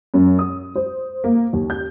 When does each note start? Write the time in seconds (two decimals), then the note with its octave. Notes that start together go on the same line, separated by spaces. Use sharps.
0.14 F#2
0.39 D#6
0.76 C5
1.24 A#3
1.53 D#2
1.70 G6